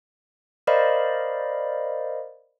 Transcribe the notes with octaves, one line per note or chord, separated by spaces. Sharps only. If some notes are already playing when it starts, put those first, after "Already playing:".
A#4 C5 D5 D#5 F5 B5